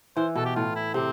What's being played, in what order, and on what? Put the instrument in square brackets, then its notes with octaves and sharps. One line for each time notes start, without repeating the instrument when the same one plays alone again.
[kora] E3 [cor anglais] C5
[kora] B2 [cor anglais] A4
[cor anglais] G4
[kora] A2 [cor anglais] F4
[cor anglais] E4
[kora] C3 [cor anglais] C4